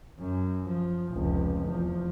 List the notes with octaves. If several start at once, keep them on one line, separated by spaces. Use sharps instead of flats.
F#2
F3
F1 C#2
E2 F3